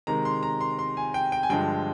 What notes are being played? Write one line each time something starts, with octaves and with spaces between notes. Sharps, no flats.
C3 D#3 G#3 A#5
C6
A#5
C6
C6
G#5
G5
G5
G#5
G2 D3 F3 G#3 G5